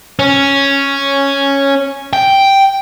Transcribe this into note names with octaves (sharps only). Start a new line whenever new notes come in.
C#4
G5